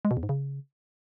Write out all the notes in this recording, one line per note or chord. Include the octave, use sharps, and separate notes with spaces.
G#3
B2
E2
G#2
C#3